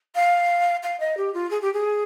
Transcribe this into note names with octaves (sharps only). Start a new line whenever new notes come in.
F5
F5
D#5
G4
F4
G#4
G4
G#4